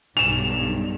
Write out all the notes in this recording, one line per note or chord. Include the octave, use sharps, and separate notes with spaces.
B1 G2 E7 F7